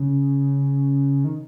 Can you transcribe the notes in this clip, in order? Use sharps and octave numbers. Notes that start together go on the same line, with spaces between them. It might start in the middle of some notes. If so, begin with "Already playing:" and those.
Already playing: C#3
D#3